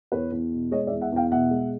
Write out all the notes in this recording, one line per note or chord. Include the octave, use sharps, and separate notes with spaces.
E2 B4 C#5
E2
B2
G#3 C#5 D#5
D5 E5
E2
E5 F#5
E2 F5 G5
B2 E5 F#5
G#3